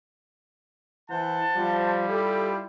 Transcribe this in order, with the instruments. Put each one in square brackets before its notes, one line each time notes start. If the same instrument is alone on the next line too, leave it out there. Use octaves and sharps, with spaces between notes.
[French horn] E3 [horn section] C5 F#5 A5
[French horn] F3 [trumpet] G3
[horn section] E4 F4 G4 [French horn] A4